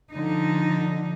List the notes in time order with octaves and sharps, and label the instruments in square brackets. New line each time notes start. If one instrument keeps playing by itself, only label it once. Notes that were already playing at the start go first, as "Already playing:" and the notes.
[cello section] D3 F3 D#4